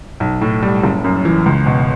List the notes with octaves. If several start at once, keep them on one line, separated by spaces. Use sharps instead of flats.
B1
A2
G3
F#1
F#2
E3
C#2
B2